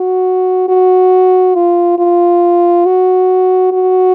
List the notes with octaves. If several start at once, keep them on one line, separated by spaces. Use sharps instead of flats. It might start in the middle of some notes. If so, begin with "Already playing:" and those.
Already playing: F#4
F#4
F4
F4
F#4
F#4